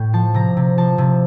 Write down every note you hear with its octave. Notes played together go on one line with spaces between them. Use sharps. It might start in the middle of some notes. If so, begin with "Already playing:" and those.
Already playing: A2 G5
F3 A5
C3 A#5
C3
F3 A5
C3